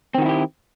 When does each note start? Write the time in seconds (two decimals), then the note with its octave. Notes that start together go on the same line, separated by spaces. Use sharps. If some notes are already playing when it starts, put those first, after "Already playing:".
0.15 C4
0.18 D#3
0.22 F#4
0.25 E4
0.29 G4